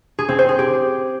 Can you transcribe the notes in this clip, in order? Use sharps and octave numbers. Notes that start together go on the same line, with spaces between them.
G#4
C4
C5
G#4
G4